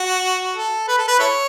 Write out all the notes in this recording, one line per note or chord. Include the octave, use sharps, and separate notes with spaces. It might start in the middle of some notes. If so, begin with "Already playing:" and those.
Already playing: F#4
A4
B4
A4
B4
E4 A4 C#5